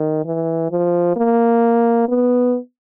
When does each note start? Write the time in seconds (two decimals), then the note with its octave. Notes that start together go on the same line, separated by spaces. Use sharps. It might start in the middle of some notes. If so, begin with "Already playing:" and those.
Already playing: D#3
0.25 E3
0.71 F3
1.16 A#3
2.09 B3